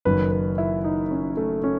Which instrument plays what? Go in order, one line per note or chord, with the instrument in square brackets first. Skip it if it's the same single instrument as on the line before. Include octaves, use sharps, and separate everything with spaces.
[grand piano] F#1 F#2 D#3 B4
B4
E4
D#4
C#4
A3
C#4